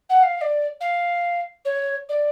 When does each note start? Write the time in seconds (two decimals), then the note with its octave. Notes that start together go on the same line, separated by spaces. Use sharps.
0.09 F#5
0.22 F5
0.36 F5
0.41 D5
0.80 F5
1.65 C#5
2.09 D5